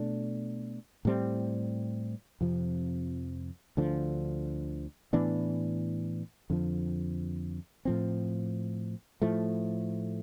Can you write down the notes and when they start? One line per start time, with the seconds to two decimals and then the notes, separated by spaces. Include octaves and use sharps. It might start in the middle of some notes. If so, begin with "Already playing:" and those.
Already playing: B2 A3 D4
1.05 A2 G3 C4
2.41 F2 C3 F3
3.77 D2 D3 F3
5.13 A2 E3 B3 D4
6.50 F2 D3 F3
7.85 A2 F3 C4
9.22 A2 F3 A3